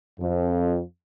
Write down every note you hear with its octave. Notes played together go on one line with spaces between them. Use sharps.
F2